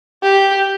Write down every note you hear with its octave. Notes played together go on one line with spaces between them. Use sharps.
G4